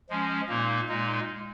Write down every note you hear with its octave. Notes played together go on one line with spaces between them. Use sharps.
F3 G#3 C#4
A#2 A#3 D#4
A#2 G#3 D#4